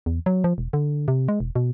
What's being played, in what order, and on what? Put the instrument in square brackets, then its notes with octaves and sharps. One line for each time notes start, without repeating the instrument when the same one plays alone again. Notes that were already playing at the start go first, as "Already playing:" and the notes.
[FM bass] E2
F#3
F3
E1
D3
C3
G#3
E1
B2